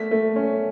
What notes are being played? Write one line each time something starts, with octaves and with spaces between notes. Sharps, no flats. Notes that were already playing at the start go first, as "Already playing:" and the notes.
Already playing: A3 B6
A3
C#4